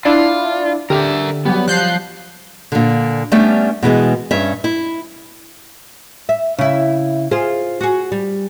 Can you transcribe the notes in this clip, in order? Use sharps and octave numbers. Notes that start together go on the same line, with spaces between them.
D4 E4 F4 D5
D3 G4 A#4 D#5 E5
F#3 G3 B3 G4
F3 F#6 G6 C7
A#2 D3
G3 A3 B3 C#4 D4
B2 E3 G#3 B3
G2 C#4 E5
E4
E5
C#3 E4
F4 G#4 C5
F#4 G#4
G3